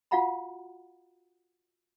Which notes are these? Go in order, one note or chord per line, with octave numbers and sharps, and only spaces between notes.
F4 F#4 F5 F#5 A#5 B5